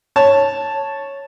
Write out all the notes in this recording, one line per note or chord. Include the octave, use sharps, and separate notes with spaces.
C#5 A5